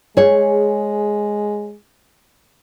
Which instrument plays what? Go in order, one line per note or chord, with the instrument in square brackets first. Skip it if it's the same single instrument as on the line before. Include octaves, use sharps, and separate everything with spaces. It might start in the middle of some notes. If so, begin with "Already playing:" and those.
[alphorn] G#3 [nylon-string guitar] G#4 C#5